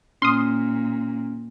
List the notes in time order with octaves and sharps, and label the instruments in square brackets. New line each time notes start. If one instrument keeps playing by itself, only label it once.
[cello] A#2 [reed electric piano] C#4 F6 [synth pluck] C6 D#6